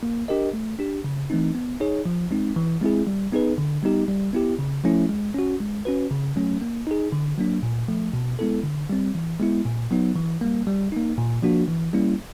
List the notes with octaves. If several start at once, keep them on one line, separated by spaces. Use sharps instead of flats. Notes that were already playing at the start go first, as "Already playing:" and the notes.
A#3
D4 G4 A#4 D#5
A3
D4 G4
C#3
E3 A3 C4 D#4
B3
D#4 G#4 C#5
F3
G#3 C4 D#4
E3
G#3 C4 E4 G#4
G3
B3 D#4 G#4 B4
D3
G3 B3 D#4 G4
G3
B3 E4 G4
C#3
F3 A3 C#4 E4
G#3
C#4 F#4
G#3
C#4 F#4 B4
C#3
F#3 A3 C#4
A#3
D#4 G#4
D3
F#3 A#3 D4
A#2
F3 A3
B2
G#3 B3 E4 A4
D3
G3 C4
E3
G#3 B3 E4
A#2
F#3 B3 D#4
E3
G3 A#3
G3
A#3 D#4
A#2
F3 A#3 D4 F#4
E3
G3 A#3 C#4 E4